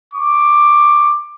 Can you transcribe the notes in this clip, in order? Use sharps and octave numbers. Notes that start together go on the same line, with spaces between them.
C#6 D6